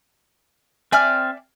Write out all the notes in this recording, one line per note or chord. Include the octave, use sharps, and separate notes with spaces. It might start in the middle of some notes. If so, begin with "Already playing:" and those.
C4 D5 E5 G#5 F6